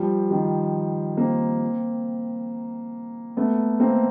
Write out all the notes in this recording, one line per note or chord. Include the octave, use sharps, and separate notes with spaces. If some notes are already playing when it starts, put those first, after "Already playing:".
Already playing: F3 G3
D#3 F3
A#3 C4
A3 B3
A#3 C4